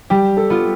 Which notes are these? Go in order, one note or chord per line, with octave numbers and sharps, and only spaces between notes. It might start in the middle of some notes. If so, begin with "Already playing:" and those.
G3 G4
A4
B3 F4